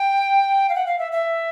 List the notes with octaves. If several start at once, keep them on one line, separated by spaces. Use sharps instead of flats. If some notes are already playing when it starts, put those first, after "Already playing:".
Already playing: G5
F5
F#5
F5
E5
E5